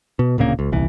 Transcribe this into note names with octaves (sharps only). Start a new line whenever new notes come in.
B2
D1 A#2 C#3 A#3
C#2
D#1 C2 E3